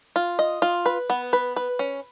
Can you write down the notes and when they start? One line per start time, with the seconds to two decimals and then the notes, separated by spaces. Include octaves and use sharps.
0.16 F4
0.39 D#5
0.62 F4
0.86 B4
1.10 B3
1.33 B4
1.56 B4
1.79 C#4